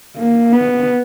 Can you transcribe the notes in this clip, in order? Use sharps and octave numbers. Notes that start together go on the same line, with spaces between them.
A#3
B3